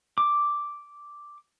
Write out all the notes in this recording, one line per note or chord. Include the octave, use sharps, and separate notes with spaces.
D6